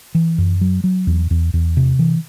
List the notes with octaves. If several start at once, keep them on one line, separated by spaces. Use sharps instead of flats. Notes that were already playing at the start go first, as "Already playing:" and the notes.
E3
F#2
F#3
F#3
E2
E2
E2
C3
E3